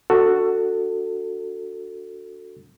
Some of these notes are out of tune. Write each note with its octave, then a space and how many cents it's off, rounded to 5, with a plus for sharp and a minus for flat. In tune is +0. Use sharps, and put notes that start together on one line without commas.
D4 +10 F#4 +0 A4 +20